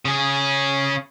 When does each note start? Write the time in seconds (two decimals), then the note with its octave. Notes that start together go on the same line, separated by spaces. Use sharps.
0.05 C#3 G#4